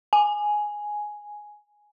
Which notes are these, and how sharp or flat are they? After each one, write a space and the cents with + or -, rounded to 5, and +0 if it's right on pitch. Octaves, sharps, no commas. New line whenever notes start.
G#5 +5